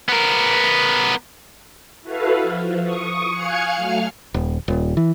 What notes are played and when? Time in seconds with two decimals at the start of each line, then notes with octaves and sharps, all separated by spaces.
0.08 B3 A#4
2.02 E4 F#4 A4 B4 F5
2.42 F3
2.82 C#6 D#6
3.30 F5 G#5 F6 F#6 G#6 C#7
3.76 F#3 A3 F5 F6
4.34 D#1
4.68 D#1
4.97 E3